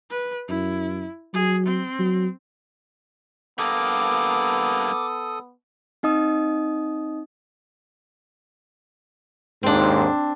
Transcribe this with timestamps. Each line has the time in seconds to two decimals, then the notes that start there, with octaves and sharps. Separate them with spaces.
0.11 B4
0.49 F#2 E4
1.34 F#3 G#4
1.66 C4
1.99 F#3
3.59 G2 A#3 B3 A4 D6 D#6
6.03 C4 D#4 D#5 D#6
9.63 D#2 G#2 C4 D4